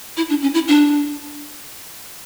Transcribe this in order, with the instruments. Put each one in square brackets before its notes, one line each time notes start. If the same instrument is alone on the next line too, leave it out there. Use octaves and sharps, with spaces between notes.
[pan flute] E4
D4
C#4
E4
D4